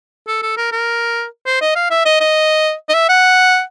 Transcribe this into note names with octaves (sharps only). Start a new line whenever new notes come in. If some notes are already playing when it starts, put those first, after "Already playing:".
A4
A4
A#4
A#4
C5
D#5
F5
E5
D#5
D#5
D#5
E5
F#5